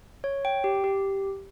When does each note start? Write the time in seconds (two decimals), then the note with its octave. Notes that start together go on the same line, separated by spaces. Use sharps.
0.24 C#5
0.45 G5
0.64 G4
0.84 G4